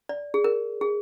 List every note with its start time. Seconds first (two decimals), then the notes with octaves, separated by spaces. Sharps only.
0.09 D5
0.34 G#4
0.44 A#4
0.81 G#4